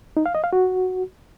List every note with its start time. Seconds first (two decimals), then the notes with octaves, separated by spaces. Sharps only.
0.17 D#4
0.26 F5
0.35 D#5
0.44 F5
0.53 F#4